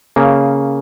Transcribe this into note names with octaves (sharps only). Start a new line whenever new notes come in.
C#3 A#3